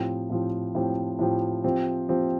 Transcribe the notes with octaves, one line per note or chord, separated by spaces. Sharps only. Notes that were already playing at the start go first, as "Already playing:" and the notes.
Already playing: A2 F3 C4 G4
A2 F3 C4 G4
A2 F3 C4 G4
A2 F3 C4 G4
F3 C4 G4
F3 C4 G4